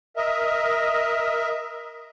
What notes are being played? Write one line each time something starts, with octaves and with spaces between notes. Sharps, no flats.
A#4 D#5 E5